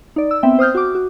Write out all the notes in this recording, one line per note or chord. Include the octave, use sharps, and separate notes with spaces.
D#4 D5
E6
B3 C4 E5 G5
C5 D#6 F6 G6
F#4 D6
F#4